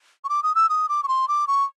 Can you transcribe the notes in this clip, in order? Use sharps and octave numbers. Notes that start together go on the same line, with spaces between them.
C#6
D6
D#6
E6
D#6
D6
C#6
C6
D6
C#6